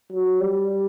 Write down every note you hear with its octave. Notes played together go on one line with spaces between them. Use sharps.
F#3
G3